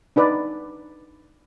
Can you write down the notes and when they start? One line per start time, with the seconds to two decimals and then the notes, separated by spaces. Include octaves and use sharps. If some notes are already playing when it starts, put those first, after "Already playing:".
0.16 D4 D#4 B4 D5